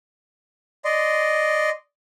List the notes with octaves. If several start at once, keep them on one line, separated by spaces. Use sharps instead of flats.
D5 D#5 C6